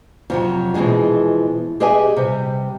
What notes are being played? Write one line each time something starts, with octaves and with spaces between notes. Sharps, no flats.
F2 C3 F#3
B2 E3 F3 G#3 G#4
G4 G#4 B4 D#5 E5 G#5
C3 G3